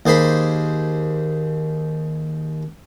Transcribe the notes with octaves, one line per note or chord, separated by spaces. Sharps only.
D#2 G#4 C5 B5